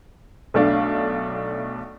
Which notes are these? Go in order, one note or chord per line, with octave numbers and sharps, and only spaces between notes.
B1 A3 D4 F5